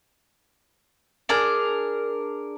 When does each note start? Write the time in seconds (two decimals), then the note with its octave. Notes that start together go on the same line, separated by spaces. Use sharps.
1.29 D4 G#4 A#4